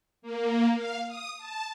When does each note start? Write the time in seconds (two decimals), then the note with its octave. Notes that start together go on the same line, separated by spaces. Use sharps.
0.22 A#3
0.75 F5
1.07 D#6
1.38 A5